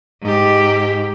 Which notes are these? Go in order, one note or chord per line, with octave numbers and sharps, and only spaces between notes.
G#2 G4